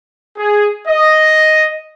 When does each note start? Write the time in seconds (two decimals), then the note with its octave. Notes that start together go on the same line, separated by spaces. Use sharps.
0.38 G#4
0.88 D#5